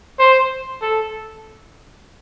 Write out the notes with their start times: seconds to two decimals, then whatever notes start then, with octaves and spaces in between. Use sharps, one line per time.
0.19 C5
0.82 A4